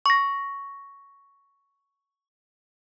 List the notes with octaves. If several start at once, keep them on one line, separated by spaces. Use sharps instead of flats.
C#6 A#6